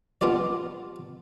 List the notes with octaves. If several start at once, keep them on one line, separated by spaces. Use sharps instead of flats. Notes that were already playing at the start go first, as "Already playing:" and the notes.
B3 D4 F4 G4 D5